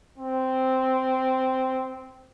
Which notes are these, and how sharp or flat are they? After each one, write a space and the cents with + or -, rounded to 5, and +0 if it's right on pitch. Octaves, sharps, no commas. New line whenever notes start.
C4 -5